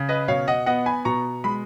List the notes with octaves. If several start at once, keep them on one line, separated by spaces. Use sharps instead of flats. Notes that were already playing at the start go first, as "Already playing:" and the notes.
Already playing: C#3
B4 D#5
B2 C#5 F5
D#5 F#5
B3 D#5 F#5
G#5 B5
B2 A#5 C#6
G#3 B5